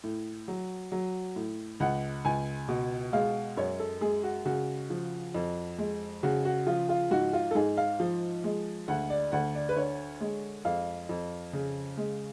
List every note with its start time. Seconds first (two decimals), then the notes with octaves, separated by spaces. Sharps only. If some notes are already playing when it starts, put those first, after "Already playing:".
0.04 A2
0.48 F#3
0.92 F#3
1.36 A2
1.80 C#2 F#5
2.25 C#2 G#5
2.68 B2
3.13 G#3 F5
3.57 F#2 C#5
3.80 A4
4.01 G#3 G#4
4.23 F#4
4.45 C#3 F#4
4.90 F3
5.34 F2
5.78 G#3
6.23 C#3 F#4
6.45 F#4
6.67 F3 F4
6.89 F4
7.11 G#2 F#4
7.33 F4
7.51 A4
7.55 G#2 G#4
7.77 F5
8.00 F3
8.44 G#3
8.88 D2 F#5
9.10 D5
9.32 D2 F#5
9.55 D5
9.69 B4
9.76 D3 C#5
10.21 G#3
10.65 F2 F5
11.09 F2
11.53 C#3
11.97 G#3